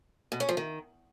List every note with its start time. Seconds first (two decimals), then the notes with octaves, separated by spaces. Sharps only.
0.32 B2
0.40 C#4
0.49 F3
0.57 D#3